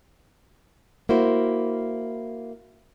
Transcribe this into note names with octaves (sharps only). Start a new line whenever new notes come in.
A#3 E4 F#4 C5